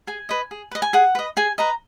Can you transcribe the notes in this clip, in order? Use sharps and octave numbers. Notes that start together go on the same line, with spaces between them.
G#4 G#5
B4 D#5
G#4
B4 D#5
G#5
G#4 F#5
B4 D#5
G#4 G#5
B4 D#5 A#5